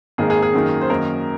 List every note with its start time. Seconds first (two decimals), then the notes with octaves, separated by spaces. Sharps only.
0.18 G#1 G#2 D#3 A#3 G#4
0.30 G#4
0.42 G#4
0.53 F#2 D#3 A#3 D#4
0.81 C5
0.90 F#2 D#3 A#3 A#4